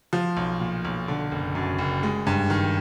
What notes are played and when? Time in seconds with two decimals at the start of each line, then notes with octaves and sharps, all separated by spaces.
0.13 F3
0.37 B1
0.60 A#2
0.85 B1
1.08 D3
1.32 F#1
1.55 F#2
1.78 F#1
2.03 G#3
2.27 G2
2.50 D#3